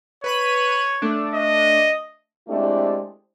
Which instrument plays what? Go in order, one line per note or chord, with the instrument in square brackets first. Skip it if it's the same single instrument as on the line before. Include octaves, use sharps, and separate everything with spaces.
[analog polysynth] B4 B5 D#7 [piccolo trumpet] C#5
[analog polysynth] A3 D4
[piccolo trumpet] D#5
[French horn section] G#3 A3 C4 D4 E4 G4